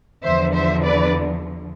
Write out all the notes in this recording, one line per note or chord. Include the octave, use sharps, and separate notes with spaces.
E2 D3 F3 C5 E5
C5 E5
B4 D5